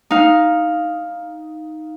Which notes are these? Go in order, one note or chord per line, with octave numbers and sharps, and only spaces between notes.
D#4 F5